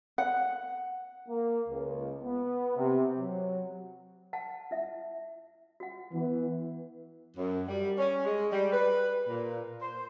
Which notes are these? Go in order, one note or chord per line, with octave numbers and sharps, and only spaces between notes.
F#5
A#3
C#2
B3
C3
F#3
F#5 A5
E4 E5
F#4 F#5
E3 B3
F#2
G3
C#4
G#3
G3
B4
A#2
C5